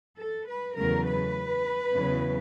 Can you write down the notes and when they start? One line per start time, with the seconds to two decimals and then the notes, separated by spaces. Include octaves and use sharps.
0.18 A4
0.47 B4
0.76 E2 C#3 F#3 A3 A#4
1.06 B4
1.94 E2 C#3 F#3